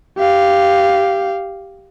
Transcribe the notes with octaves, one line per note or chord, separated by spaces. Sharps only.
G4 F5